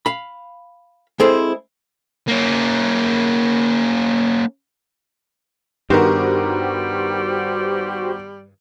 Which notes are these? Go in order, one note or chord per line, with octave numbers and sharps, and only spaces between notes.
F5 B5
G#3 C4 E4 G#4 A4 C5
A#3 C#4
G2 D#3 G3 B3 F#4 G4 A#4 C5